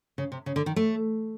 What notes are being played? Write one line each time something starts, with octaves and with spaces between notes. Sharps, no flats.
C#3
C3
C#3
D3
D#3
A3